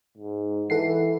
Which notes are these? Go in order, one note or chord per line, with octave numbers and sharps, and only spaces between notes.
G#2
E3 A4 F#5 C7